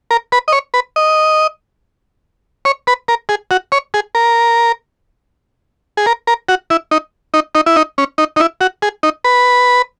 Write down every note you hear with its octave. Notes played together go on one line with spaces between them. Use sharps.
A#4
B4
D#5
C#5
B4
D#5
C#5
B4
A#4
G#4
F#4
C#5
G#4
A#4
G#4
A#4
A#4
F#4
E4
D#4
D#4
D#4
E4
D#4
C#4
D#4
D#4
E4
F#4
G#4
D#4
B4